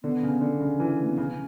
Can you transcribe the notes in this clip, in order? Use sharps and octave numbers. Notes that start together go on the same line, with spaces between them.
D3 B3
C#3
D3
C#3
E3
A3
B3
C#3 C#4